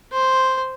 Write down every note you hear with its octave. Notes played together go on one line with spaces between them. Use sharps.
C5